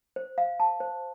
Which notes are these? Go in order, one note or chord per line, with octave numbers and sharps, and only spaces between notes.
C5
F5
A5
C5